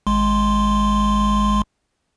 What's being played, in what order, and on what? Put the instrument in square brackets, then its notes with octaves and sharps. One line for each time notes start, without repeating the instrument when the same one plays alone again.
[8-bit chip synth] G#1 G#3 C6